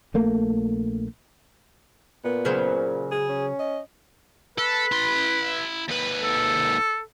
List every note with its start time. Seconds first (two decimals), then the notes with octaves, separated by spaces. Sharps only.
0.14 A#1 A3 A#3
2.25 A#2 B3
2.45 C#3 F#3 C5
3.12 G#4
3.29 C#4
3.59 D#5
4.58 A4 B4
4.92 E4 C6
5.89 D#2 B4
6.23 A4